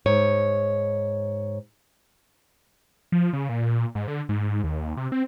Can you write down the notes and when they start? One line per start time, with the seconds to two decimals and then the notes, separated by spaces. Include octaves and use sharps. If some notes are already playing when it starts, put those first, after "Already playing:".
0.06 G#2 C#5
3.12 F3
3.33 C#3
3.49 A#2
3.95 G#2
4.08 D3
4.29 G#2
4.64 D#2
4.97 C3
5.12 C4